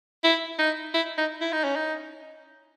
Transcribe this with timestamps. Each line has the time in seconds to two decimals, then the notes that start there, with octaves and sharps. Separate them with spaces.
0.24 E4
0.59 D#4
0.94 E4
1.18 D#4
1.41 E4
1.52 D#4
1.64 C#4
1.76 D#4